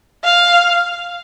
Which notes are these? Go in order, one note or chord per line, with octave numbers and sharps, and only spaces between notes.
F5